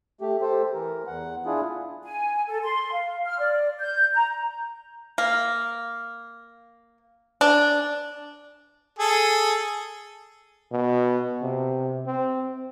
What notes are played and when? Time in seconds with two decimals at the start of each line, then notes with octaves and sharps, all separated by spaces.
0.21 A3 G4
0.41 G4 A4 C5
0.73 E3 A#4
1.07 E2 F#5
1.46 D4 E4 F4 G#4
2.04 G#5
2.48 A4
2.64 C6
2.92 F5
3.26 F6
3.39 D5
3.80 G6
4.14 A#5
5.18 A#3
7.41 D4
8.99 G#4 A4
10.71 B2
11.42 C3
12.07 C4